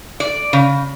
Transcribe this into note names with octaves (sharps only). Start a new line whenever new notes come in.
D5
C#3